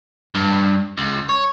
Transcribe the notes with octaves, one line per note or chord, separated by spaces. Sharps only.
G2
C#2
C#5